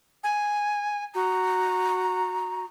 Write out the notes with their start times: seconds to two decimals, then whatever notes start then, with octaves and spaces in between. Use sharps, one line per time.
0.24 G#5
1.15 F#4 A#5